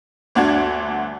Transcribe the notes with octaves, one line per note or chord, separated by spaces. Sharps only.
G1 D2 D4 F#4 G#6